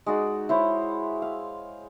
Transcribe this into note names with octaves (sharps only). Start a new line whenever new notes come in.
G#3 D#4 F#4 D5
E4 C5 C#5
F5